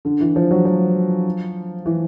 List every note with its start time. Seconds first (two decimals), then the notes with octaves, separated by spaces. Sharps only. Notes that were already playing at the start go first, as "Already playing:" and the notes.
0.05 D3
0.21 E3
0.36 F3
0.51 F#3
0.65 F3
1.86 E3